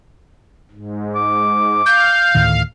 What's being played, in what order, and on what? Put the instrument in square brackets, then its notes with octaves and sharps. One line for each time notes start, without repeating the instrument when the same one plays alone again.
[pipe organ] G#2
[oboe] D6
[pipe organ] F5 [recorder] G6
[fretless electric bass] D2 A2 D#3